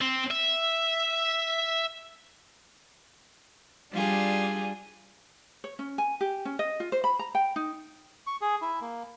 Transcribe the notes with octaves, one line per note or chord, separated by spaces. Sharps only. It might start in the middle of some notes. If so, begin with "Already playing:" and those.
C4
E5
G3 D4 F4 G#4
C#5
C#4
G#5
G4
C#4
D#5
F4
C5
B5
A#5
G5
D#4
C#6
G#4
E4
A#3